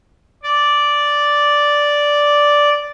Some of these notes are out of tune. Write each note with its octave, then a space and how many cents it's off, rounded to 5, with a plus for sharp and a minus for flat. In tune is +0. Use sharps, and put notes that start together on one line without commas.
D5 -5